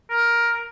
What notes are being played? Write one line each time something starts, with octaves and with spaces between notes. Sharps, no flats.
A#4